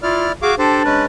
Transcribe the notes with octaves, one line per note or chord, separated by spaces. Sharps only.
E4 F4 D5 F6
F#4 G#4 F5 D6
D4 G4 A4 C5
G#3 C#4 B4